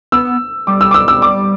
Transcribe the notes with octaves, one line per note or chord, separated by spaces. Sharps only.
B3 E6
G3 D6
E6
D6
E6
E6
D6